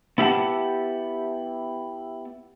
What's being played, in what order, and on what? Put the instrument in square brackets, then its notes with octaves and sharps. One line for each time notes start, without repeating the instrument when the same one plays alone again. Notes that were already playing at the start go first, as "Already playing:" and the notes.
[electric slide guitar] B3 E4 G4 F5 F#5 A5